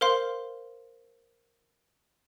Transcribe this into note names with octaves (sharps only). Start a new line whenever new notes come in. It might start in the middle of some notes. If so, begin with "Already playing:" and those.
A#4 C5 F5 C6